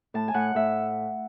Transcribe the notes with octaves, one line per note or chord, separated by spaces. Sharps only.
A2 A5
G#5
A2 F#5
A2 E5